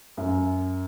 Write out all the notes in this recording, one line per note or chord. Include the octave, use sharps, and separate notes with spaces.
F#2